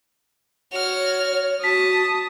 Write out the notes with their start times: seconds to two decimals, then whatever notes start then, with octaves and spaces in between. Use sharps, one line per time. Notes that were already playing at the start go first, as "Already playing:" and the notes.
0.72 F#4 C#5 F6
1.64 F#4 A5 D#6 B6